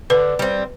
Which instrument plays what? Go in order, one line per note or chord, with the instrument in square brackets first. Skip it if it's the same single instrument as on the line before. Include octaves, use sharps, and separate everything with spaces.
[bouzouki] D3 [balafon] B4
[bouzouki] G3 C4